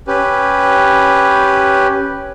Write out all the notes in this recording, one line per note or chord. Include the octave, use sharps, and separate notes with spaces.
C#4 G4 B4